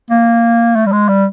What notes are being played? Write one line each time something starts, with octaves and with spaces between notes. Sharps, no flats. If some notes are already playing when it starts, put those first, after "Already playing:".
A#3
A3
G3
G#3
G3